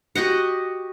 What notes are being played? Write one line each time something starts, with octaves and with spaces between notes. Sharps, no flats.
F#4 G4 D#5 F#5